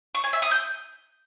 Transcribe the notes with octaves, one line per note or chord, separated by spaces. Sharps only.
C#6
G#5
E5
D#6
G6